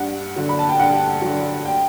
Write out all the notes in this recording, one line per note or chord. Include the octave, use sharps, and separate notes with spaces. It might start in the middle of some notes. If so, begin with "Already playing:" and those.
Already playing: G2 F#5
D3 F#3
B5
A5
G5
G2 F#5
D3 F#3
G5